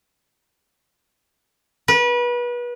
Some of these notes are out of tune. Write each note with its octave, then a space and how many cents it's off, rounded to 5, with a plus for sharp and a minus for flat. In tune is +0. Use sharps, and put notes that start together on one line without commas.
B4 -30